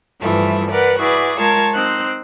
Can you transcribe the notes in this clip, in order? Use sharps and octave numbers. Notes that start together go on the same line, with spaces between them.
G2 E3 F3 G3 A3 E4
A#4 B4 D5 F#5
E4 F#4 G#4 B4 D5
G#3 F4 A#4 C#5 A5 G#6
C4 D#4 C5 F#6